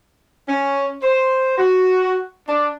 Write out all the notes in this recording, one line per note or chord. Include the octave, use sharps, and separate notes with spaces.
C#4
C5
F#4
D4